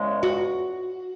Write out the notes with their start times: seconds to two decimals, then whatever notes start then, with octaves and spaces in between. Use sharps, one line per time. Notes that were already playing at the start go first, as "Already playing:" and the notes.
Already playing: E2 C#3 G#3
0.23 F#4